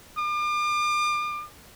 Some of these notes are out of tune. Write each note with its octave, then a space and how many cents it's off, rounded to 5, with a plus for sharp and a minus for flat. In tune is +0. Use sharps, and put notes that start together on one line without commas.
D6 +40